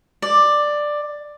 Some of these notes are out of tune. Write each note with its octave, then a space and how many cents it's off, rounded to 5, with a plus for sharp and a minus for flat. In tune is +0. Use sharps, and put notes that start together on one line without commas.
D5 +10